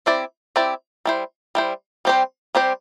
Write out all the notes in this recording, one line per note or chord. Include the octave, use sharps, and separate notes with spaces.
C4 E4 G4 D5
C4 E4 G4 D5
G3 E4 C5
G3 E4 C5
G3 C4 G4 C5
G3 C4 G4 C5